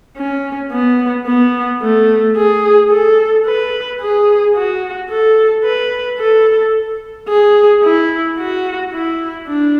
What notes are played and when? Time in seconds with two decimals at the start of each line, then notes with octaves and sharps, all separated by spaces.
0.17 C#4
0.72 B3
1.27 B3
1.82 A3
2.36 G#4
2.91 A4
3.46 B4
4.01 G#4
4.56 F#4
5.10 A4
5.65 B4
6.19 A4
7.29 G#4
7.84 E4
8.39 F#4
8.93 E4
9.48 D4